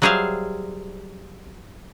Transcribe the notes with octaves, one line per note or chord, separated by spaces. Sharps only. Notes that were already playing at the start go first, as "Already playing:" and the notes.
F#3 G3 G#4 C5 E5 F5